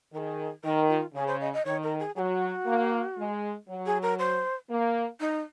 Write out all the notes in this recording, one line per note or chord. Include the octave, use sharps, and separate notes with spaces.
D#3 G#4 A#4
D#3 A#4
F4
C#3 G#4
C5
D#5
D#5
D#3 C#5
A#4
G#4
F#3 F#4 G#4
A#3
G#3
F#3
G#4
A#4
C5
A#3
D#4